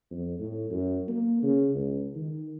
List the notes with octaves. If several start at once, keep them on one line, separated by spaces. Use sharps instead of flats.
F2
A2
F#2
A#3
C#3
C#2
D#3